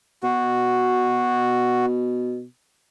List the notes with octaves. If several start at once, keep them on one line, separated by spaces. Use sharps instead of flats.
B2 F#4